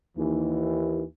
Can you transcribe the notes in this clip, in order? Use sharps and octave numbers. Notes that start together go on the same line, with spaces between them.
D#2 E3